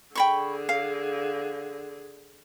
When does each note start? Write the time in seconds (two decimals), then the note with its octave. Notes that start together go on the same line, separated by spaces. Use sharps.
0.15 D3 G#4 G5 B5 C#6
0.69 F5